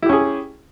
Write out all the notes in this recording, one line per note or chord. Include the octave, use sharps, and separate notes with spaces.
C#4 E4 G4 G#4